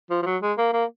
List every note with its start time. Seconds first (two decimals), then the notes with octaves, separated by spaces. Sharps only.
0.10 F3
0.22 F3
0.26 F#3
0.42 G#3
0.58 A#3
0.73 A#3